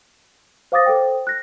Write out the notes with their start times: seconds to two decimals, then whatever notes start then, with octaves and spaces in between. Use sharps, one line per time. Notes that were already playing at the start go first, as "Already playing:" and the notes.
0.72 C5 F5 D6 D#6 A6 A#6
0.86 A4 C5 G5
1.27 F#6 A#6